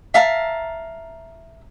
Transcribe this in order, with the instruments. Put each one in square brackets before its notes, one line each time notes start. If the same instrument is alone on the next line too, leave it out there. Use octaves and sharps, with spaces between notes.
[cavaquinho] E5 F5 A5 A#5